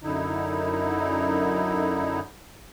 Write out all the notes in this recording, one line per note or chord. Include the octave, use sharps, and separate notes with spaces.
F#2 D3 D#4 E4